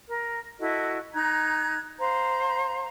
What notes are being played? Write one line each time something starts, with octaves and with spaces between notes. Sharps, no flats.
A#4
E4 F#4 A4 D#5
D#4 A#5 F#6 G#6
C5 F5 A#5